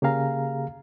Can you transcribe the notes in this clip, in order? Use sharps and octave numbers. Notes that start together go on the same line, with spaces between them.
C#3 A#3 G4 G#4 F5 A#5